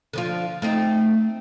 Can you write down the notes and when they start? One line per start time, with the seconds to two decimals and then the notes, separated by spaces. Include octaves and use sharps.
0.13 D3 F3 F4
0.62 A3 C4 D#4